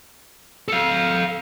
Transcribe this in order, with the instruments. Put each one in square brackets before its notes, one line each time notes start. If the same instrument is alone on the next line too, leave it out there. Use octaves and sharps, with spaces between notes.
[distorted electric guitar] A4 F5